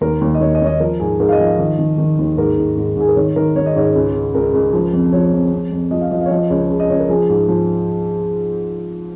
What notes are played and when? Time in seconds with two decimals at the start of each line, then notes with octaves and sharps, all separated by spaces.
0.01 D#2 A#4
0.21 D#2
0.34 D#5
0.40 D#2 C#5
0.55 D#5
0.61 D#2 C#5
0.67 D#5
0.80 F3 A#4
1.00 G#2 G#4
1.20 G#2 A#4
1.29 F5
1.32 D#5
1.40 F3
1.46 F5
1.59 D#3 D#5
1.79 D#3
1.98 D#3
2.19 D#2
2.37 G#2 A#4
2.58 G#2
2.77 G#2
2.97 G#2 G#4
3.08 A#4
3.16 D#3 C#5
3.36 D#3 A#4
3.56 D#3 C#5
3.66 D#5
3.76 G#2 C#5
3.95 C#2
4.14 C#3
4.34 C#2 A#4
4.54 C#2
4.73 F3
4.93 F2
5.13 F3 C#5
5.33 F2
5.52 F2
5.72 F2
5.91 F3 D#5
6.01 F5
6.11 F3 D#5
6.21 F5
6.26 C#5
6.31 F3 D#5
6.50 C#2 C#5
6.71 C#3
6.80 D#5
6.90 C#2 C#5
7.00 A#4
7.09 F3 G#4
7.29 G#2
7.48 F3